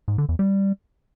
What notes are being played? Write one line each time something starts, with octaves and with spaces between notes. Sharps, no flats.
G#2
D3
E2
G3